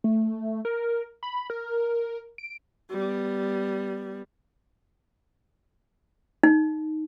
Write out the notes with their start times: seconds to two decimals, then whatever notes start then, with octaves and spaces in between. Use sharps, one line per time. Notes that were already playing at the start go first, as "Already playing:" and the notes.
0.04 A3
0.65 A#4
1.23 B5
1.50 A#4
2.38 D7
2.91 G3 B3
6.43 D#4